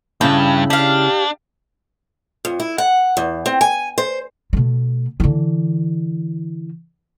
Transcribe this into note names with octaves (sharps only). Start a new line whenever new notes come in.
G2 C#3 E4 G5 A5
D4 G4 F5
F2
E4
F#5
E2
C4
G#5
C5
B2 A3
D3 E3